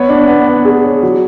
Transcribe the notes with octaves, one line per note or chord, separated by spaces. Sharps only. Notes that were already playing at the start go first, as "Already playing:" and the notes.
Already playing: B3 C#5
D4
B3
B3
G#4
C#5
F#3